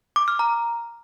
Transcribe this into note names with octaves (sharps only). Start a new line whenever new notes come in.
D6
F6
A#5